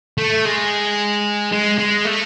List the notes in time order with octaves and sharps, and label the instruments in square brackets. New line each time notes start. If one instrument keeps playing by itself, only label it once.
[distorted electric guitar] A3
G#3
G#3
G#3
A3